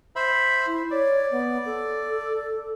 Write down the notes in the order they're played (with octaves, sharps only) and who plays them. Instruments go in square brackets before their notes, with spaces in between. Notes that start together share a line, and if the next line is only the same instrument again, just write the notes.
[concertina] C5 E5 B5
[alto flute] E4
[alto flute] C#5 [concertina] D5
[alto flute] B3
A4